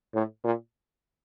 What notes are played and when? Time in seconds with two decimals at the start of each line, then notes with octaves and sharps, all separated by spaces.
0.14 A2
0.44 A#2